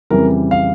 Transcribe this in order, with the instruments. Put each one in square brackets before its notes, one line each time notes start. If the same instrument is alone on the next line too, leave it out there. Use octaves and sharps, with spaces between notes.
[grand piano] F2 C#3 E3 G3 A#4
F5